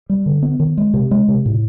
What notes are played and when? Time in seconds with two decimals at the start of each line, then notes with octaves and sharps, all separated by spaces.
0.09 G3
0.26 D3
0.42 B3
0.60 D#3
0.78 G#3
0.94 C3
1.11 G#3
1.29 C3
1.46 A2